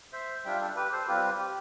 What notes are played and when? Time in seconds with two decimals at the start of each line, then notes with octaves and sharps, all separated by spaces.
0.13 C5 E5
0.45 G3 D4 F4 E5 G5
0.61 A4
0.76 G4 B4
0.92 A4 C5
1.08 G3 C4 F4 G4 B4
1.40 G4